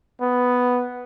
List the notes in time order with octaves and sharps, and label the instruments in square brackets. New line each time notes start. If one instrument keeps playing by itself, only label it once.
[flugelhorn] B3